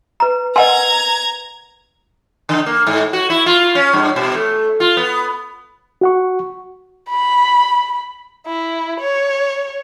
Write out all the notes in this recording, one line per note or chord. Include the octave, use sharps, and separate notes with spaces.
B4 A#5
A#4 B4 D#5 F#5 G#5 A#5 C6 G#6
D3
A#3
G#2
F#4
E4
F4
C#4
G2
B2
A3
F4
B3
F#4 F#5 C#6
B5
E4
C#5